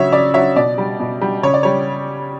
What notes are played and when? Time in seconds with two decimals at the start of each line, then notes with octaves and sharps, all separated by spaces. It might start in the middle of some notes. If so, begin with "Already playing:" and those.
Already playing: C#3 F#3 C#5 E5
0.12 C#3 D5
0.34 F#3 C#5 E5
0.56 B2 D5
0.78 G3
1.00 B2
1.21 G3
1.43 C#3 C#5
1.54 D5
1.63 G3 C#5